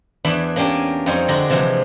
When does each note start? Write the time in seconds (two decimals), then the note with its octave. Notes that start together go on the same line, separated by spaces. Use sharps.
0.25 E2 E3 D4 B5
0.56 A#3 C#4 D4 G4 A#4
1.06 F2 G3 D#4 C5 C#5
1.29 D3 G#3 F#4 D5 G5 A#5
1.50 C3 E3 F3 G#3